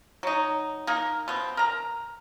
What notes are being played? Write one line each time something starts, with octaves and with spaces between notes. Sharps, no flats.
F#3 D#4
A#3 D#4 A#4
B2 C4
A#4 A#5